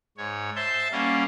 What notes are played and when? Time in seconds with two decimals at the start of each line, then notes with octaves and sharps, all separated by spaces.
0.17 G#2 C#5
0.56 C5 E5 A5 G6
0.92 G3 A#3 C#4 F5 F#5